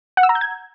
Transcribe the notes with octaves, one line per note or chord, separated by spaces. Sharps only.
F#5
E6
A#5
G6
G#6